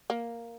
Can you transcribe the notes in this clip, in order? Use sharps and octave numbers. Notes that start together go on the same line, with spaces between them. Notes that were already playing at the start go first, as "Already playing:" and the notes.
A#3